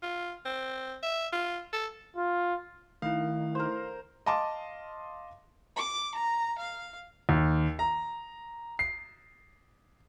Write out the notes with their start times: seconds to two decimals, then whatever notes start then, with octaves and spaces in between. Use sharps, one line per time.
0.02 F4
0.45 C4
1.03 E5
1.33 F4
1.73 A4
2.17 F4
3.02 D#3 A3 E4 F5
3.55 A#4 C5
4.26 D#5 F5 A5 C6 D6
5.76 D6
6.14 A#5
6.58 F5
7.29 D#2
7.79 A#5
8.79 C7